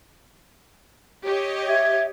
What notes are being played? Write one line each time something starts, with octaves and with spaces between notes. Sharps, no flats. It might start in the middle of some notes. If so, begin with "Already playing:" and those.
G4 C#5 D#5
E5 G#6